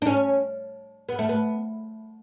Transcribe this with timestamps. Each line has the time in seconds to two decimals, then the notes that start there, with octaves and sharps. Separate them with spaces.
0.02 D4
0.07 C#4
1.09 B3
1.19 A3
1.29 B3